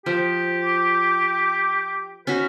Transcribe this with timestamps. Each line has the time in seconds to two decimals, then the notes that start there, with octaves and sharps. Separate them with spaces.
0.06 F3 G4
0.63 D6
2.27 C#4 D#4 F#4 B4